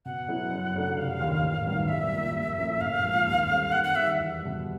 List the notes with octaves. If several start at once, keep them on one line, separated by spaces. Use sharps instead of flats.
B2 F#5
F#3 B3 E4 G#4
F#2
C#3 F#3 A3 D4
F1 F5
D#2 D#3
A1
G2 D#3 F#3 B3
C2 E5
A#2 G3 A#3
A#1
A2 F3 A#3 C#4
A#1 F5
G#2 F3 A#3
D#2
D3 G3 C4
D#2 F#5
F#5
D#3 G3 E5
E2
B2 G3